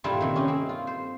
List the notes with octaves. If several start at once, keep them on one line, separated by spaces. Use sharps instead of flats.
G2 A#2 G3 D4 E4 F4
C3 D#3
C#4 D#4 E4
C4
F4
C5